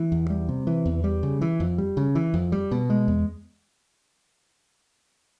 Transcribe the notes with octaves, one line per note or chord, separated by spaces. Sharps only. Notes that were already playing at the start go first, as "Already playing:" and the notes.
Already playing: E3
E2
G3
C3
E3
E2
G3
C#3
E3
F2
G3
C#3
E3
F2
G3
B2
G#3
E2